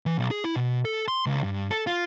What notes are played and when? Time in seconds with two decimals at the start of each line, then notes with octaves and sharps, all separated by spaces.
0.06 E3
0.18 B1
0.31 G#4
0.44 E4
0.56 B2
0.85 A4
1.08 C6
1.26 C#2
1.44 G2
1.71 A4
1.87 F4